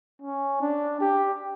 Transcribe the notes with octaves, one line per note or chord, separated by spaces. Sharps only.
C#4
D4
G4